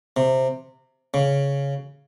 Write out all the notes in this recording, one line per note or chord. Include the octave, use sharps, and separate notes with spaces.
C3
C#3